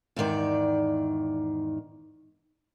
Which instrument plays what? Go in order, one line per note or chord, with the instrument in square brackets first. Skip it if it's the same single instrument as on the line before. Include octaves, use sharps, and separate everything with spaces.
[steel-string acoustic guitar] E2 G#2 D#3 D5